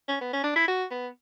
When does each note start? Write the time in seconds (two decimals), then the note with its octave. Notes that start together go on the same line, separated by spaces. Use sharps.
0.08 C#4
0.21 B3
0.33 C#4
0.44 D4
0.56 E4
0.68 F#4
0.91 B3